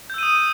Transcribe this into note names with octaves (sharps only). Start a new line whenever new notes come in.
D#6 E6 G6 D#7